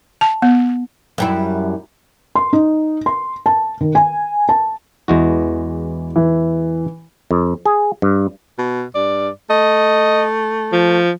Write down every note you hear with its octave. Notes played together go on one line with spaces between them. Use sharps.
A5
B3
F#2 G3 E4
C6
D#4
C6
A5
D#3
G#5
A5
E2 E3 G#3 F#4
E3
F2
G#4
G2
B2
G2 D5
A3 D#5
F3